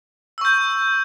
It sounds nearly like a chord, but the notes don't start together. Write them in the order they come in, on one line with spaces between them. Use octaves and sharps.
E6 C#6 G6